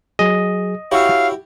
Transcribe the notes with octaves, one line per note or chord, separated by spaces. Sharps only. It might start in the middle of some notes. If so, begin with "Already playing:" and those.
F#3 G#4 D#5
E4 F#4 G4 C#5 F5 C#6 E6